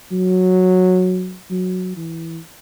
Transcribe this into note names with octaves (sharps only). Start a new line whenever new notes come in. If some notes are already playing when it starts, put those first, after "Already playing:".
F#3
F#3
E3